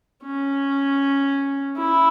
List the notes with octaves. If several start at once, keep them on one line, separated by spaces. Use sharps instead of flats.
C#4
E4